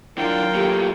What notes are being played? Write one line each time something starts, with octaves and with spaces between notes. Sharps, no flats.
D3 F#3 D4 E4 F4 A#4 G5
A#2 A3 G4